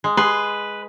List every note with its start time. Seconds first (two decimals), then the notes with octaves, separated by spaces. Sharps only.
0.04 G#3
0.17 G#4 B4 C6